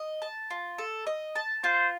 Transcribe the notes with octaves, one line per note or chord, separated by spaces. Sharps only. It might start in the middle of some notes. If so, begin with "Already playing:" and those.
Already playing: D#5
A5
F4
A4
D#5
A5
F4 C5